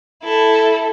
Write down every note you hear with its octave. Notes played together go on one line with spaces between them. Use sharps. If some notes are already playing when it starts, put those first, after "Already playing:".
E4 A4